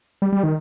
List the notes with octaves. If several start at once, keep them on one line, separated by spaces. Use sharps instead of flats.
G3
G3
D#3